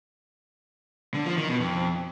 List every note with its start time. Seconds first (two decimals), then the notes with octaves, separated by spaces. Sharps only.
1.14 D3
1.26 F3
1.37 D#3
1.49 B2
1.60 F2